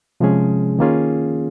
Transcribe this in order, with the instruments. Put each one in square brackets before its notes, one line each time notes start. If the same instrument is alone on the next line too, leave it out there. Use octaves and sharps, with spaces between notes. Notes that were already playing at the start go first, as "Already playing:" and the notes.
[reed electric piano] C3 F3 G#3 C#4 G#4
D#3 A#3 C#4 F4 G#4